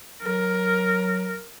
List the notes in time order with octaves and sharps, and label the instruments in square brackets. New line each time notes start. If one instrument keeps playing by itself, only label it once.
[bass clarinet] F#3 [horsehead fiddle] A#4